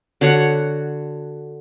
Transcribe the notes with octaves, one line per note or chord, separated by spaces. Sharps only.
D3 F#4 C#5 F#5